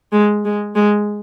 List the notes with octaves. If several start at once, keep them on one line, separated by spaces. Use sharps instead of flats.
G#3
G#3
G#3